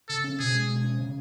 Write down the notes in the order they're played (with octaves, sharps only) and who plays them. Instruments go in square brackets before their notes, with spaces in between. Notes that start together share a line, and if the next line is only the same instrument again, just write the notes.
[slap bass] C#3 [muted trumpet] A4
[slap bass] C#4
[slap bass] B2 [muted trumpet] G#4
[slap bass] G#3
B2
C#4
C#3